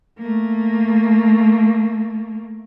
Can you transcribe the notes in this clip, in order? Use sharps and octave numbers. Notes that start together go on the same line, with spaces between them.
A3 A#3